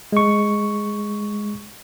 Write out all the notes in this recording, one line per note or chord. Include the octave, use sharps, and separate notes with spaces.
G#3 C#6